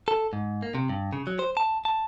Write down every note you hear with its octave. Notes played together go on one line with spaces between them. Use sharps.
A4
G#2
A#3
C3
G2
C#3
F#3
C5
A5
A5